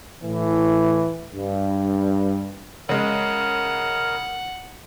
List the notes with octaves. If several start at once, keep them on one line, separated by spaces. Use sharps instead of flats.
A2 E3
G2
C#3 G#3 A#4 F#5